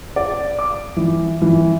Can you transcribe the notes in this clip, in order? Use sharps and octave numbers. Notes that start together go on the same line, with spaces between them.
D5
D6
E3
E3